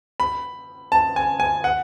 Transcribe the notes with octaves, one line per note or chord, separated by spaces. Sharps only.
B5
A5
G#5
G#5
F#5